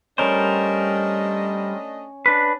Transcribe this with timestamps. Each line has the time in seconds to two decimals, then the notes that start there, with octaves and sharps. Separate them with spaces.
0.18 G3 A3 C#4 D4 A#4 C5 D#5
2.26 D4 B4